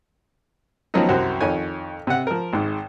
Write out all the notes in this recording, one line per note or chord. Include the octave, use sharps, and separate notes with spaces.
D#3 F3 F#3 B3 C#4 D#4
C2 F#2 F#4 C5
F2 D#3 C#5 G#5
C3 F#5
F3 A#4
G#1 G#2